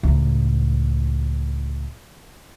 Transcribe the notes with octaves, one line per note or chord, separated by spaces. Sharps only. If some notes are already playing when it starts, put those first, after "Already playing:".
C#2 A2